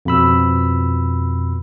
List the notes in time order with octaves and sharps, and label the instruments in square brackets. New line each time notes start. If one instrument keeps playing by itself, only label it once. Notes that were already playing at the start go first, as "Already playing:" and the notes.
[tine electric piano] F2 B2 B5 E6